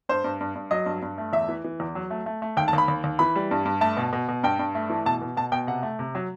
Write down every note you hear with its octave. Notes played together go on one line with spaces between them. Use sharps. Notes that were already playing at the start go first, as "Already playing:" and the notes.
G2 C5
G2
G2
G2
F#3 D#5
G2
G2
A3
E2 E5
E3
E3
E2
F#3
A3
A3
A3
D#2 G5
A5
D#2 B5
D#2
D#2
E3 B5
G3
G2
G2
A3 A5
B2
B2
B2
G2 G5
G2
A3
E3
B2 A5
B2
B2 A5
B2 G5
C3 F#5
A3
C3
F#3